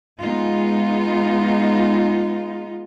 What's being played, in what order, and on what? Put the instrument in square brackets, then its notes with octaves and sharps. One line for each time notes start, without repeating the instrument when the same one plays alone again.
[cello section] G#3 B3 D#4 F4